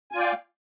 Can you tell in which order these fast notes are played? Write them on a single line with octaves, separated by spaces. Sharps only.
G#5 F4 D5 G5 F5